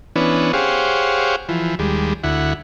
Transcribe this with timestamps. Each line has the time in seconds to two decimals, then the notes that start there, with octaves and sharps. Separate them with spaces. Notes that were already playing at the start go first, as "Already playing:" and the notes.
0.16 E3 B3 C#4 D4
0.53 G4 G#4 C5 C#5 F5 F#5
1.49 E3 F3
1.79 D#2 G3 G#3
2.24 D2 E4 F#5